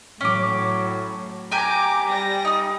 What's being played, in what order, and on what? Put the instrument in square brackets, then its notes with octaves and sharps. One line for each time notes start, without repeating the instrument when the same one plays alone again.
[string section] A2 F#3 [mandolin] C#4 D6
[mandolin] G4 G#5 G6 [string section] A#5 D6
[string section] G3 A#6
[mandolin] D#4 D#6